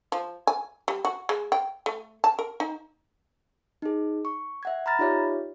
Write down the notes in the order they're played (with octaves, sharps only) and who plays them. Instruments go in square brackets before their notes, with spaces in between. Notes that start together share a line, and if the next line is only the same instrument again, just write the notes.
[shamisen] F3
G#5
G3
F#4
G#3
G5
A3
A5
A#4
D#4
[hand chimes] D#4 G#4
C#6
E5 F#5 G#6
A#5 B5 F6 A6 A#6
D#4 F4 G4 C#5 D5 E5